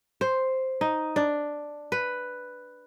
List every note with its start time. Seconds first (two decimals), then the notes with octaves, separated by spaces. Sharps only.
0.21 C5
0.81 D#4
1.16 D4
1.92 B4